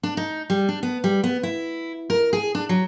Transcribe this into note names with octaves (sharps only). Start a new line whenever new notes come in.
D4
D#4
G3
D4
B3
G3
B3
E4
A#4
G#4
D4
F#3